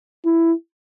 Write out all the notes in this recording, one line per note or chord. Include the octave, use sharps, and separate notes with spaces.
E4